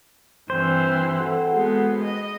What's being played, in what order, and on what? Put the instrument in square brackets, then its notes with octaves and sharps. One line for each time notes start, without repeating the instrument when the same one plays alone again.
[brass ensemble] G2 [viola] E3 C4 [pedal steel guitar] C5
[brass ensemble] F#4 A4 F#5
[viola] G#3 B3
D#5